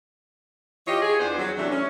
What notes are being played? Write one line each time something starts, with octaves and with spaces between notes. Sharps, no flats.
E3 F4 G4 C#5 D#5
G#4
E2 B3 D4 C5
F#3
C3 E3 F#3 A3 D4 F#4
C#4